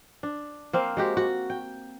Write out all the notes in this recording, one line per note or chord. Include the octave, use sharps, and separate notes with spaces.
D4
A#3 C4 F5
G#3 F#4 G4
F#4
G5